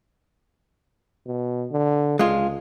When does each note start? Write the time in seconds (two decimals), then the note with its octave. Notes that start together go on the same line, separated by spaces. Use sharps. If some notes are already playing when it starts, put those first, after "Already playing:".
1.27 B2
1.72 D3
2.19 C#2 G#3 F4